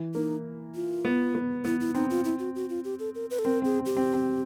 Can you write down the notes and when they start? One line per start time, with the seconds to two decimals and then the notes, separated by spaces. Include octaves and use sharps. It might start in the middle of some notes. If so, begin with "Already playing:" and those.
Already playing: E3
0.14 A#3 D#4
0.75 F4
1.05 B3
1.35 B3
1.65 B3 E4
1.80 E4
1.95 C4 D#4
2.10 F4
2.24 E4
2.39 F#4
2.55 F#4
2.69 F4
2.84 G4
2.99 A4
3.15 A#4
3.30 B4
3.39 A4
3.45 C4 A#4
3.62 C4 G#4
3.79 C4
3.86 G4
3.96 C4
4.13 C4